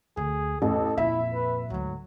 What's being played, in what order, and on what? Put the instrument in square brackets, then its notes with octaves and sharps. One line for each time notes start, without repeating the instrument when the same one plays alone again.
[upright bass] D2 [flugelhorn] G#4
[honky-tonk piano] A1 [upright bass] E2 [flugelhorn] A4
[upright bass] F2 A#2 [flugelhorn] E4 [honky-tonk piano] E5
[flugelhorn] B4
[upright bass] D2 G#2 [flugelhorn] F#3